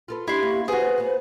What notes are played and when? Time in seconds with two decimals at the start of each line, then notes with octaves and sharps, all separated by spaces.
0.08 F4 A4 B4
0.28 D4 E4 G4 C6
0.42 A#3 B3 C#4
0.68 F#4 G#4 B4 C5
0.98 B3 C5